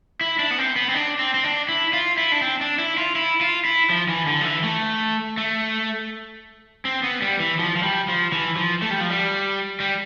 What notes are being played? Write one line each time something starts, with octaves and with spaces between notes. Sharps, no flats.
E4
D4
B3
C4
B3
C4
D4
C4
C4
D4
E4
F4
E4
D4
C4
D4
E4
F4
E4
F4
E4
F3
E3
D3
F3
E3
A3
A3
C4
B3
G3
E3
F3
F3
G3
F3
E3
F3
A3
G3
F3
G3
G3